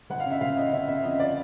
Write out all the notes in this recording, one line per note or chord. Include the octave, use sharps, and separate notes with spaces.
G1 F#5
F5
C#3
E5
G1 F5
C#3 D#5
C#3 E5
C#3 E5
F2 D#5
D5